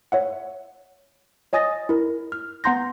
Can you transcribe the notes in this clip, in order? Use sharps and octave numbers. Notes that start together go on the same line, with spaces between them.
C#5 E5 F#5
C#5 D#5 G#5 D#6 A6 A#6
E4 A#4
F6
B3 F#5 A#5 C6 G6 A#6